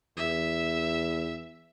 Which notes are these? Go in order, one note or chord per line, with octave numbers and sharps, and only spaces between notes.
E2 E5